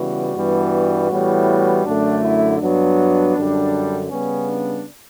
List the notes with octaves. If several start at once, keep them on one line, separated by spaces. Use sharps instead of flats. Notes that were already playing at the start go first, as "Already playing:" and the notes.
Already playing: C#3 E3 G3 B3 F#4
G2 E3 G3 B3
A2 E3 G3 B3
F#2 D3 A3 D4
E4
G2 F#3 B3 D4
F#2 D3 G3
C#3 G3 B3 C#4
D4